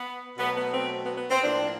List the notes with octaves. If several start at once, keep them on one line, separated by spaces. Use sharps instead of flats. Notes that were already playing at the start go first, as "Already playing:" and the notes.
Already playing: B3
B2 F#3 A3 B3
B3
C4
B3
B3
C4
A2 F3 A#3 D4